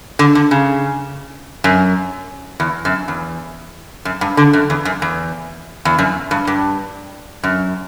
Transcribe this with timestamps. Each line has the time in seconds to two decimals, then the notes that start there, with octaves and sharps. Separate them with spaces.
0.19 D3
0.35 D3
0.51 C#3
1.64 F#2
2.60 E2
2.85 F#2
3.08 E2
4.05 F#2
4.21 G2
4.37 D3
4.53 F#2
4.70 E2
4.85 F#2
5.02 E2
5.85 E2
5.99 F#2
6.31 G2
6.47 G2
7.43 F#2